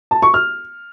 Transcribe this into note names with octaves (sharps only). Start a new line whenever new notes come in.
A5
C#6
F6